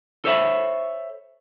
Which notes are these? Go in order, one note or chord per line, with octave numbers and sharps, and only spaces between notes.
A4 C5 C#5 E5 G#5 B5